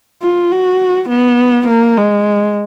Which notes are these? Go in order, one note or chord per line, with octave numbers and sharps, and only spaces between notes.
F4
F#4
B3
A#3
G#3